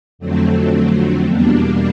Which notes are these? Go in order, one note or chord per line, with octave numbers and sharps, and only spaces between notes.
F2 D3 F#3 A3 C4
E2 B2 G3 A#3 D4